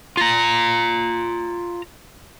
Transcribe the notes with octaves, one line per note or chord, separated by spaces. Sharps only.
F4 A#5